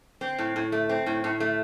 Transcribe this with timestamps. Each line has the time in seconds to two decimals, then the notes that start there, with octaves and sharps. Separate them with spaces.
0.21 C4
0.39 A2
0.56 A2
0.72 A3
0.89 C4
1.06 A2
1.24 A2
1.40 A3